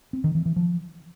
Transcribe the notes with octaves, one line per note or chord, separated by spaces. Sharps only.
C4
D#3
E3
E3
F3